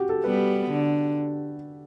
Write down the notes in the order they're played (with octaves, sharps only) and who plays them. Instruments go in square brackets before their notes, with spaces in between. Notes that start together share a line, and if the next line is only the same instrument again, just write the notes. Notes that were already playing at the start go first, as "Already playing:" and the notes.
Already playing: [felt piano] F#4 G4
A4
[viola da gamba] G3 B3 [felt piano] B4
[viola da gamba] D3